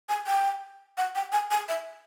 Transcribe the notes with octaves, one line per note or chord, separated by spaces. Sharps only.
G#5
G5
F#5
G5
G#5
G#5
E5